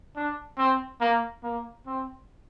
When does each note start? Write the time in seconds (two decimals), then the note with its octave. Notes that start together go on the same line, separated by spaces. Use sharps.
0.16 D4
0.58 C4
1.01 A#3
1.44 A#3
1.87 C4